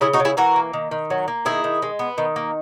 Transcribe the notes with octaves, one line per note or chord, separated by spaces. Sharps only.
C#3 E4 G#4
D#4 F#4
C#3
E4 G#4
E3 F#4 A#4
A#3
D#3
D#3
F#3
A#3
D#3 E4 G#4
D#3
G#3
B3
D#3
A#3